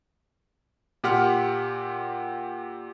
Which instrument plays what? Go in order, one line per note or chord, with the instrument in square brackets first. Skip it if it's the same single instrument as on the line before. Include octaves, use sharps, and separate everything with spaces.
[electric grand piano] A#2 G4 F#5 C6 F6